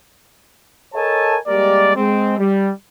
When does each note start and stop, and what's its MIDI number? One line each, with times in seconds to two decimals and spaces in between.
0.95 1.37 69
0.95 1.37 70
0.95 1.37 73
0.95 1.37 75
0.95 1.37 80
0.95 1.37 81
1.47 1.92 55
1.47 1.92 56
1.47 1.92 58
1.47 1.92 67
1.47 1.92 70
1.47 1.92 74
1.96 2.38 56
1.96 2.38 60
2.38 2.71 55